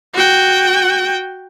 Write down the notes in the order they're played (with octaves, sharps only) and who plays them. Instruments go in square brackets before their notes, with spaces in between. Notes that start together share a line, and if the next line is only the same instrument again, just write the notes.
[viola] F#4 G5